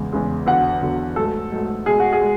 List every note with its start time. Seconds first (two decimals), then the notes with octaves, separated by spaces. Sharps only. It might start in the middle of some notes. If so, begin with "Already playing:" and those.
Already playing: E2 C#3 G#3
0.12 E2 C#3 G#3
0.46 E2 D3 F#3 F#5
0.82 E2 D3 F#3
1.16 G#2 F#3 A3 A4
1.52 G#2 F#3 A3
1.86 B2 G#3 G#4
2.00 F#4
2.13 G#4
2.21 G#3